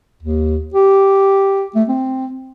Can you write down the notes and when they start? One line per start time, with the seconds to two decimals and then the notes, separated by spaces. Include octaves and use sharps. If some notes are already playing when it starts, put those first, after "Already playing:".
0.23 D#2
0.74 G4
1.75 A3
1.89 C4